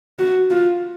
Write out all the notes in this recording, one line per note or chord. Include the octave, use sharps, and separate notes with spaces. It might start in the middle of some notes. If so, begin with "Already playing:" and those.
F#4
F4